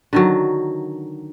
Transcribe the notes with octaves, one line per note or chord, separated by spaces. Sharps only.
D3 D#3 F#3